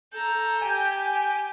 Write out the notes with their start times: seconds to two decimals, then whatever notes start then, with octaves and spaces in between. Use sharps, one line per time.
0.12 A4 A#5 G6
0.61 G4 G#5